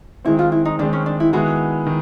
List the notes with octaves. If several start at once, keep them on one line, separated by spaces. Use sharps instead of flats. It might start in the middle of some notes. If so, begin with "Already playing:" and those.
D#3 G#3 C4 E4
F4
E4
D#4
D#3 G#3 C4 D4
C#4
D4
E4
D#3 G#3 B3 E4 F#4 G#4
D#3